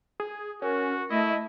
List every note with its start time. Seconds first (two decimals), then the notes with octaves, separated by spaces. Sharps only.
0.20 G#4
0.62 C#4 F#4 A#4
1.10 A3 E4 D#5